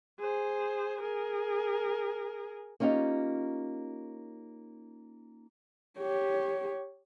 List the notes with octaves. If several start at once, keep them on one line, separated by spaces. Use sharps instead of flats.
G#4 C5
G#4 A#4
A#3 C#4 D#4 F4 G4
G4 C#5